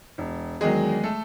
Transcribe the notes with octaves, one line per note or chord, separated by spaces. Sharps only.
E1
E2 D#3 F#3 G#3 G#4
A3 A4